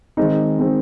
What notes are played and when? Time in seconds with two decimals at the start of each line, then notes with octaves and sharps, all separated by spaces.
0.17 D#3 G#3 C4 D#4
0.59 D#3 G#3 C4